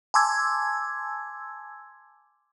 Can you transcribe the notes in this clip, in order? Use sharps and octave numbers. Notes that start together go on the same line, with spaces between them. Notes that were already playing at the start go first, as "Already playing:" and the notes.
G#5 A5 C6 D6 E6 G#6